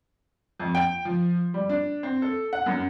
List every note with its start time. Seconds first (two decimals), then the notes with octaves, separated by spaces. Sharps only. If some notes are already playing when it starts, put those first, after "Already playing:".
0.60 F2
0.75 G5
1.05 F3
1.54 G3
1.69 D4
2.03 C4
2.22 A4
2.53 F#5
2.66 F#2